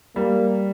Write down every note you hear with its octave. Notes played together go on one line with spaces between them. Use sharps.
G3 A#3